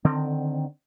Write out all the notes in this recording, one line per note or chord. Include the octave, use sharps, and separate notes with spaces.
D3 D#3 C4